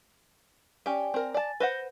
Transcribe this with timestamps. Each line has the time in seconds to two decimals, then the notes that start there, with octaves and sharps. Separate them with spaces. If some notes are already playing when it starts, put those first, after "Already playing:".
0.86 C#4 G4 D5 G5 G#5
1.14 C4 A#4
1.34 D5 G#5 A5 A6
1.60 B4 C5 F#5 G6 A#6 G7